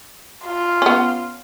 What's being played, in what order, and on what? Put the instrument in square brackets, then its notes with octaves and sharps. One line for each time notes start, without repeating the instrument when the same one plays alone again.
[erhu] F4
[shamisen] B3 C#4